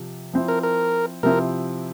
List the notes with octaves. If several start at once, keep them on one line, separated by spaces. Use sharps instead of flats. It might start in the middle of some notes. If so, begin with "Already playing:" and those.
Already playing: C3 F3
F3 C4 E4
A#4
A#4
C3 F3 C4 E4 A#4